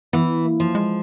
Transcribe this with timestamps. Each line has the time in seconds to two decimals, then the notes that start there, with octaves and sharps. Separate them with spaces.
0.13 E3 B3
0.44 A#3
0.60 F3
0.75 G#3